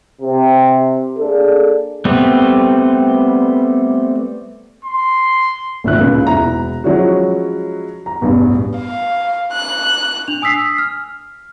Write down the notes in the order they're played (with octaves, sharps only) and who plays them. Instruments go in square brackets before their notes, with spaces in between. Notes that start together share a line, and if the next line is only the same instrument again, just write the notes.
[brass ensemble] C3
A#3 D4 G#4 A4
[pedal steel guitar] G3 A3 B3 C4
[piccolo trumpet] C6
[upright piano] G#1 D2 A2 F3 E5 F#6
C#2 A#2 C#3
E1 E4 A#5
F3 F#3 G#3 C#4 E4 F#4
A#5
A1 E2 G2 B2
[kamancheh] F5
F#6
[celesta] D4 F7
G#5 D#6 E6 B6 C7
F6